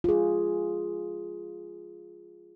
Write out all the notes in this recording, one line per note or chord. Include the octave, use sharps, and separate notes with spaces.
F4 G#4